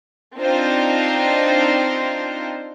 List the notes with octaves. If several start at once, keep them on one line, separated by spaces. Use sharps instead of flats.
C4 D4 D#4 F4 C5